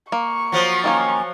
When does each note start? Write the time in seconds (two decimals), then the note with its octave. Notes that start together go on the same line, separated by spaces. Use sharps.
0.12 A#3 C#6
0.52 F3 F#3
0.84 D#3 A#3 C#4